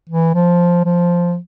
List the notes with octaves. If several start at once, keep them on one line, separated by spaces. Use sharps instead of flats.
E3
F3
F3